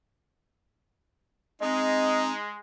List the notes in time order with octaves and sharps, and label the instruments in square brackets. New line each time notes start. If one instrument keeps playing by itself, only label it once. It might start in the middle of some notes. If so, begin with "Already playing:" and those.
[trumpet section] G#3 [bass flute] C4 [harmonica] D#4 [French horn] D#5